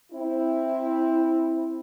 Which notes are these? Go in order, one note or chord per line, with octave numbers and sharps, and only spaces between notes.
C4 E4